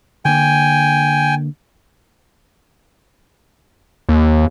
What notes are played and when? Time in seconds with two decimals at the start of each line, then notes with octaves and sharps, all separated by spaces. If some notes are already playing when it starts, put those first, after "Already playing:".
0.25 D3 A#3 G5 G#5
4.09 D#2